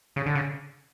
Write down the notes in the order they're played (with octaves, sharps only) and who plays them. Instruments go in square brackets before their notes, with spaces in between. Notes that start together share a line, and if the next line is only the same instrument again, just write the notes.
[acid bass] C#3
D3
C#3